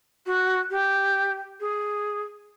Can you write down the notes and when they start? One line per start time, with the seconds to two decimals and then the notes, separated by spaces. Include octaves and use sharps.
0.26 F#4
0.70 G4
1.60 G#4